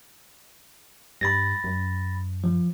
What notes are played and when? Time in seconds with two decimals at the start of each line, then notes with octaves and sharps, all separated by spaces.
1.21 G2 B5 A6 A#6
1.64 F#2
2.44 F3